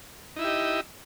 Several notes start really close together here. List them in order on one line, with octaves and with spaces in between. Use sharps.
D#4 E4 E5 G4 D#5